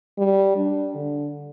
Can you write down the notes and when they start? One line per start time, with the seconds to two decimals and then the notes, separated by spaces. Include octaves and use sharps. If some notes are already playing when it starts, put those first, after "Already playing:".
0.18 G3
0.56 D4
0.94 D3